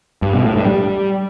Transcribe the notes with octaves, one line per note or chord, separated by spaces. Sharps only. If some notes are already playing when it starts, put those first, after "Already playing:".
G2
B2
A2
G2
G3